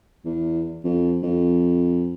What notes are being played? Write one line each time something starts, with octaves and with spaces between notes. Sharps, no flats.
E2
F2
F2